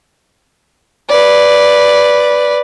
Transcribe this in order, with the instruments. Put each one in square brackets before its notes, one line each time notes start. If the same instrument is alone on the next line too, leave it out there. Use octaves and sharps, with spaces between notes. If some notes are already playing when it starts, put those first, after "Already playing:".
[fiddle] B4 D5